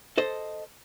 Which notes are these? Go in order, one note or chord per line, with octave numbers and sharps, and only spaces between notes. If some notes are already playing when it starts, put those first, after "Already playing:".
A4 C5 D#5